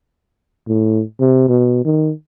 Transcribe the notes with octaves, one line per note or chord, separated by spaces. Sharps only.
A2
C3
B2
D#3